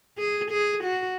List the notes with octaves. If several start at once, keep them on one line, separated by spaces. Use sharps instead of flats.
G#4
G#4
F#4